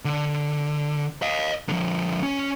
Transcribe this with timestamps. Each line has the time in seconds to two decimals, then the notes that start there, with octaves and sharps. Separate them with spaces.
0.05 D3
1.22 D#5 F5
1.69 D3 F3
2.23 C#4 C#5